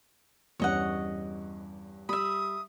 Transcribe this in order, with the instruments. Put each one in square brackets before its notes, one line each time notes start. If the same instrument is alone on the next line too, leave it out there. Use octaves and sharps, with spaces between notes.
[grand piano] E2 G2 C#4 [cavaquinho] C#5 D#5 F#5
[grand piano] G3 [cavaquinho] E5 B5 [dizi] D#6